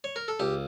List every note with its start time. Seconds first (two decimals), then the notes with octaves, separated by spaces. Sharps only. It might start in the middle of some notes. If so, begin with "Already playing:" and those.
0.04 C#5
0.16 A#4
0.28 A4
0.40 C#2 G4